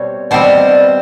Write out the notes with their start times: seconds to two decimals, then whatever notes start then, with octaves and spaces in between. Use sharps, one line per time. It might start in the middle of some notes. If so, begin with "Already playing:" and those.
Already playing: B2 G3 C4 C#5
0.31 B2 G3 C4 C5